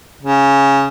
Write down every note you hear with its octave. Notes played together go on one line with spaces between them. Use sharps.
C#3